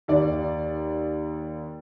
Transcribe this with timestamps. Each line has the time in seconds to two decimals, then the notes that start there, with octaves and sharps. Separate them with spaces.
0.08 D#2 D5